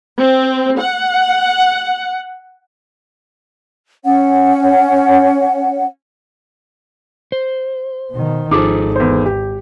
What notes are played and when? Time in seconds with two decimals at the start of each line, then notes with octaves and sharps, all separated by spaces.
0.18 C4
0.78 F#5
4.04 C#4 C#5 F#5
7.32 C5
8.12 B2 D#3
8.51 G#1 F3 D#4 G#4 A4 D6
8.96 E2 C5
9.25 G4